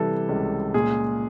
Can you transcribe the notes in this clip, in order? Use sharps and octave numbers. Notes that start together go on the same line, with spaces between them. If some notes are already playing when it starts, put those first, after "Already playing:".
Already playing: C3 E3 G3 A4
C#2
A#2 G#4